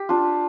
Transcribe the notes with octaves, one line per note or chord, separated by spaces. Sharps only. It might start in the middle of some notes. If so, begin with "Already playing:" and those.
Already playing: G4
D4 F4